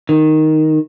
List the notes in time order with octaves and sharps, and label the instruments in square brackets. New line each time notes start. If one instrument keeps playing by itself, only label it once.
[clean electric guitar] D#3